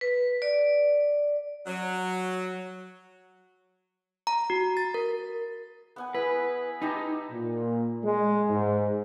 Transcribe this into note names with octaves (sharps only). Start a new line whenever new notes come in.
B4
D5
F#3
A#5
F#4
A6
A#4
B3 F#5 G#5
E4 G#4 B4
D#4 E4 G4 A5
A#2
G#3
G#2